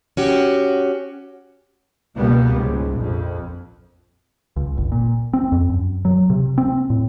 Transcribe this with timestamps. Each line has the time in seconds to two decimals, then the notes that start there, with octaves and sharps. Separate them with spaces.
0.17 C#4 F#4 G4
2.16 C#2 B2 G3 A#3 B3
2.52 C#2 G#2
2.95 A#1 F2
4.56 C#2
4.77 G1
4.92 A#2
5.33 C4
5.52 F2
5.70 F#2
6.05 F#3
6.30 C3
6.58 C4
6.90 A2